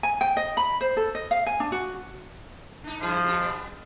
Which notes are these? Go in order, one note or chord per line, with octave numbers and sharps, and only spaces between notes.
G#5
G5
D#5
B5
C5
A4
D#5
F5
G#5
D4
F#4
D4 D#4
F#2 F3 E4 G#4
G3 D4 F#4
G3 B3